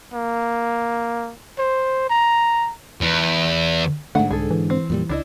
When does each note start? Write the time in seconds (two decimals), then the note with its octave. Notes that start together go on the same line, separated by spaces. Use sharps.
0.14 A#3
1.58 C5
2.10 A#5
3.01 E2
4.15 G#2 D3 F#3 A3 F#5
4.31 C2 G#4 A4
4.50 E3
4.70 C4
4.90 F2 A#2 G3
5.09 C#2 D4 E4 D#5